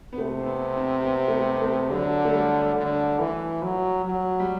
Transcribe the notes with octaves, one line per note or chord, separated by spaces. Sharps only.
B3
C3 A3
C4
B3
C4
B3
A3
B3
B3
A3
D3 F#3
A3
G3
D3
E3
F#3
F#3
G3